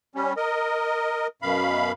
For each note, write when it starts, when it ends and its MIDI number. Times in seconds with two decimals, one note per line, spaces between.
0.15 0.33 55
0.15 0.33 61
0.37 1.27 70
0.37 1.27 75
1.42 1.92 42
1.42 1.92 47
1.42 1.92 77
1.42 1.92 83